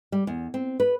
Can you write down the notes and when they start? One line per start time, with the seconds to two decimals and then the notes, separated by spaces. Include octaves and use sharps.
0.12 G3
0.27 E2
0.54 C4
0.80 B4